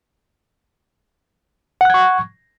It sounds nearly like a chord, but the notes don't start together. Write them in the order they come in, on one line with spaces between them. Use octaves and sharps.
F#5 F#6 G#6 C#6